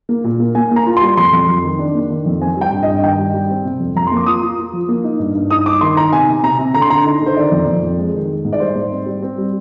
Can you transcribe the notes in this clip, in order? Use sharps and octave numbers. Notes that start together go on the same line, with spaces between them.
A#3
A#2
A#3
A#3 G#5
A#3
A#5
F4
C6
G3
F2 C6
F2
F2
D#3
D4
A#3
D#3
F2
C4 G#5
G3 G5
G2
D#5
G2
D#3 G5
G3
G3
C4
C3
F2
F2 A#5
A#3 C6
D6
F4 D#6
F4
F4
F3
A#3
D#4
G2
G2
D#4 D#6
D#4 D6
D#3 C6
D#4 A#5
C3 G#5
C3
C3 A#5
C3
D3 A#5
C6
D3 A#5
D#4
D3
C5
D#3 D5
F2
F2
F2
G#3
D#3
G#3
G#2
D5
G3 C5
G#2
C4
G3
C4
G3